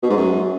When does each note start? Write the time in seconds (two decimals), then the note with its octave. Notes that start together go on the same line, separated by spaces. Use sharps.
0.03 B2
0.10 G#2
0.17 F#2